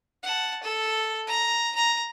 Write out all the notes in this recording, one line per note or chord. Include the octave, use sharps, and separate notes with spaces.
F#5 A5
A4
A#5
A#5